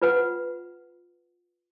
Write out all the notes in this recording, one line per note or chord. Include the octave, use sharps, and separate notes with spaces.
F4 B4 F#5